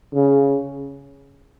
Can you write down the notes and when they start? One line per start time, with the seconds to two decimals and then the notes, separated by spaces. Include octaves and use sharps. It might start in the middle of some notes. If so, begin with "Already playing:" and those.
0.14 C#3